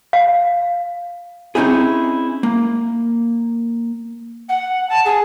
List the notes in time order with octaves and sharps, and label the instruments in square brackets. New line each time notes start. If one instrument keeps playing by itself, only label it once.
[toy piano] F5
[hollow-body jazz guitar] C4 C#4 D#4 E4 G#4
A#3
[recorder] F#5
A5
G#4